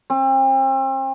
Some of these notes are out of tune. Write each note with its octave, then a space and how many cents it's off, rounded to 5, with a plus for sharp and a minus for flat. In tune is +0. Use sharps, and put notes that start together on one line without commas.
C4 +40